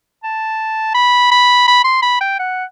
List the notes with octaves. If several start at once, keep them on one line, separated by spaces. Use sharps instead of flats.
A5
B5
B5
B5
C6
B5
G5
F#5